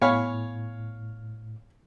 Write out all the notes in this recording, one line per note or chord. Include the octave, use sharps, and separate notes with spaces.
A2 B3 C#5 F5 G#5 B5 C#6